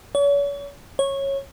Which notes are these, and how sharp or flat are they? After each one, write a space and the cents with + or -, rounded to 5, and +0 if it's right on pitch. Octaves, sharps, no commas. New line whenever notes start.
C#5 +40
C#5 -15